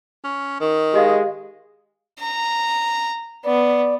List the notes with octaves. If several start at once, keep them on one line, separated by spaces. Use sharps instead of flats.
C#4
D#3
G#3 G4 D#5 F5
A#5
B3 D5